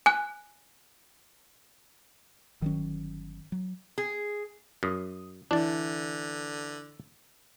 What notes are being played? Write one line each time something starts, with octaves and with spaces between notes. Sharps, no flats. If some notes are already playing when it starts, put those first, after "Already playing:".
G#5 F#6
G1 D#3 F#3 C#4
F#3
G#4
F#2 D#6
D3 E3 D4 D5